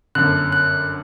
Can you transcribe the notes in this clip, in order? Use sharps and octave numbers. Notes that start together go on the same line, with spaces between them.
G1 F#2 D3 F#6
F#6